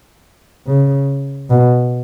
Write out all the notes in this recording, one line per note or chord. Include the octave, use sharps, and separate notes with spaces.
C#3
B2